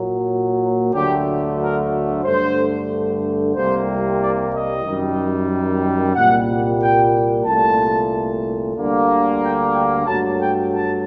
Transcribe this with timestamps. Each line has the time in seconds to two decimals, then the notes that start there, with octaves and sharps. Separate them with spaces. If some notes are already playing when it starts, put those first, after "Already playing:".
Already playing: A#2 F#3 A#3
0.93 D2 D3 F#3 A3 G4
1.58 A#4
2.24 G2 D3 A3 C5
3.54 C2 C3 G3 A#3 C5
4.20 D5
4.52 D#5
4.85 F#2 D#3 G3
6.15 C2 A#2 G3 A#3 F#5
6.81 G5
7.46 C2 A#2 A3 A5
8.76 D2 D3 G3 A#3
9.42 G5
9.74 G5
10.07 G2 F#3 A3 A5
10.39 G5
10.72 A5